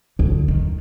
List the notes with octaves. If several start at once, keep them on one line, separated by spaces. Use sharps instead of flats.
D2
D#3